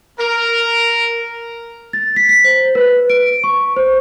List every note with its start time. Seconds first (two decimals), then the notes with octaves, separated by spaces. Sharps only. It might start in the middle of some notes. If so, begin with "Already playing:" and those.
0.19 A#4
1.93 A6
2.16 B6
2.29 B6
2.44 C5
2.75 B4
3.10 D7
3.44 C#6
3.76 C5